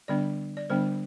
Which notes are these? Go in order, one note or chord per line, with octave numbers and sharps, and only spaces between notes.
D3 G3 B3 D4 D5
D5
D3 G3 B3 D4 C5